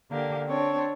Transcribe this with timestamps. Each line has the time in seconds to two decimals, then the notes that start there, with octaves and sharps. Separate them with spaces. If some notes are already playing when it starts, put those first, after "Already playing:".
0.10 D3 A#3 G4
0.47 C4 D4 C#5